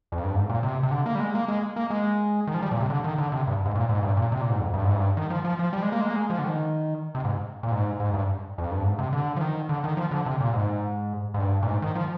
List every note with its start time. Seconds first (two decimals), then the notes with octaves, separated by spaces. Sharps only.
0.12 F2
0.24 G2
0.36 G#2
0.49 A#2
0.63 C3
0.83 C3
0.91 D3
1.06 A#3
1.15 G3
1.20 G#3
1.35 A#3
1.48 G#3
1.76 A#3
1.90 G#3
2.47 D#3
2.54 F3
2.62 G3
2.71 A#2
2.80 C3
2.90 D3
3.04 D#3
3.18 D3
3.32 C3
3.47 G2
3.65 G#2
3.75 A#2
3.89 G#2
4.03 G2
4.17 A#2
4.32 C3
4.42 A#2
4.50 G#2
4.59 F2
4.74 G2
4.85 G#2
4.95 G2
5.17 D#3
5.30 F3
5.45 F3
5.59 F3
5.73 G3
5.82 G#3
5.92 A#3
6.01 G#3
6.10 A#3
6.16 G#3
6.30 F3
6.39 D3
6.44 D#3
7.15 C3
7.25 G#2
7.63 A#2
7.72 G#2
8.00 G#2
8.14 G2
8.58 F2
8.71 G2
8.84 G#2
8.99 C3
9.13 D3
9.36 F3
9.41 D#3
9.69 D3
9.84 D#3
9.97 F3
10.11 D3
10.26 C3
10.40 A#2
10.54 G#2
11.34 G#2
11.39 G2
11.63 A#2
11.67 G#2
11.82 D#3
11.95 F3